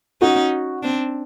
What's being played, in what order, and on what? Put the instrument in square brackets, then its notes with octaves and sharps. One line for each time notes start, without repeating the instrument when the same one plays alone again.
[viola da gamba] C#4 D#4 [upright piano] F#4
[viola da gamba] C4 D4